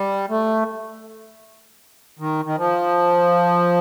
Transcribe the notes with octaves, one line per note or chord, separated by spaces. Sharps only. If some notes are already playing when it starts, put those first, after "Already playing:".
Already playing: G3
A3
D#3
D#3
F3